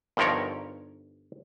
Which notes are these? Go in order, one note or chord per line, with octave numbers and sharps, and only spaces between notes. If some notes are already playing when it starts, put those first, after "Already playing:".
G1 G2 D#3 F3 A#4 C#5